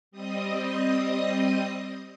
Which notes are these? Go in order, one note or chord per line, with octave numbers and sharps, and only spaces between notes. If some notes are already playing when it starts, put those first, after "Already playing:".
G3 C4 D#5 D#6